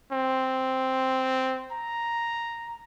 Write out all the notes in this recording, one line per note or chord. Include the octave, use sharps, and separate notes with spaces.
C4
A#5